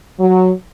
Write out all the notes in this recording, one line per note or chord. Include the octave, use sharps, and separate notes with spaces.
F#3